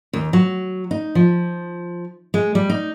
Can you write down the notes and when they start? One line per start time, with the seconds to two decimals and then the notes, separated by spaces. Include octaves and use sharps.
0.13 D#2
0.33 F#3
0.91 D#4
1.15 F3
2.34 G#3
2.55 G3
2.70 D#4